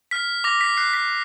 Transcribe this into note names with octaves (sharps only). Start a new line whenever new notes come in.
F6 B6
D6 A#6
B6
F#6 C7
B6